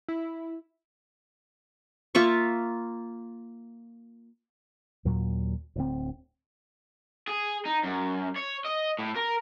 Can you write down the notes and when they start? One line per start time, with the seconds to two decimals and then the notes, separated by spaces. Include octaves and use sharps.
0.08 E4
2.15 A#3 F4 E5 C#6
5.05 D#2 A#2 F#3
5.76 D1 D2 C4
7.28 G#4
7.65 D#4
7.83 F#2
8.36 C#5
8.65 D#5
8.99 A2
9.16 A#4